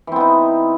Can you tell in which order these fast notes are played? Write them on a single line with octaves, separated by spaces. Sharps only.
E3 C4 B3 D#4